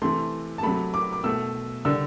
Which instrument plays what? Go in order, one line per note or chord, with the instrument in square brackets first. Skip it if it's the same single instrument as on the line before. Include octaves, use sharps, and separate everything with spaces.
[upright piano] C3 E3 A3 C6
A5
C3 F#3 A3 B5
D6
D6
B2 A3 E6
D3 G3 E6